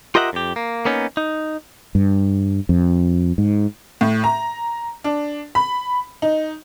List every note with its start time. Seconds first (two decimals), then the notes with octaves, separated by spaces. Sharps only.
0.15 F4 G4 A#4 D#5 E5 F#5
0.33 F2 G4
0.56 A#3
0.85 A#3 B3 C#4 D#4
1.17 D#4
1.95 G2
2.69 F2
3.38 G#2
4.01 A2
4.24 A#5
5.04 D4
5.55 B5
6.22 D#4